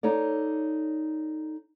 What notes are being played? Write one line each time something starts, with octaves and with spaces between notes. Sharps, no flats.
D#4 A4 C#5 D5